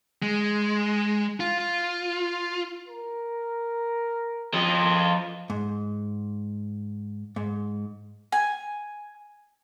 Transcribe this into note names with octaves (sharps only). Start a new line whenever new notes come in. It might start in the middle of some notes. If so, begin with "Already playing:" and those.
G#3
F4
F4
A#4
F3 D#5
G#2
G#2
G#5